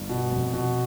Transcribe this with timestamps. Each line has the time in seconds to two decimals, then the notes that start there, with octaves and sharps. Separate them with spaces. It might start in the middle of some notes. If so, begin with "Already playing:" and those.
Already playing: G1
0.09 B2
0.31 F1
0.53 B2